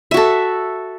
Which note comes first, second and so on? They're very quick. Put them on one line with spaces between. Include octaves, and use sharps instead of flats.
E5 F#4 A4